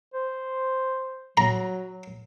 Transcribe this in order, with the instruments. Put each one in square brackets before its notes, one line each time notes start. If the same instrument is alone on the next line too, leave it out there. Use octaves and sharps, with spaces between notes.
[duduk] C5
[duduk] F#3 [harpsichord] A#5